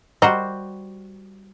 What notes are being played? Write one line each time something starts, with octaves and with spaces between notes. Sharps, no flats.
G3 F#4 C5 D#5 A#5